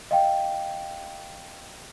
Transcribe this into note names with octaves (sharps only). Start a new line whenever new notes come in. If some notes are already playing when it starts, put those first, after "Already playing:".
D#5 F5 G5